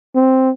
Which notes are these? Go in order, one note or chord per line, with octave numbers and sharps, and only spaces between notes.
C4